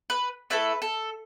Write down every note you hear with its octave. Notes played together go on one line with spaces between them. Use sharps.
B4
A3 E4 A4 B4
A4